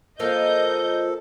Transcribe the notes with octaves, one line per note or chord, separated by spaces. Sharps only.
F3 A#3 A4 D#5 G6